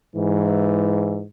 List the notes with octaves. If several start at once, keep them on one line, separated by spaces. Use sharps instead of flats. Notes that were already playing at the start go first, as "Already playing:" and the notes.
G#2 E3